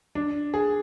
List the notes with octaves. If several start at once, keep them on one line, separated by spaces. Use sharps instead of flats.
D4
G#4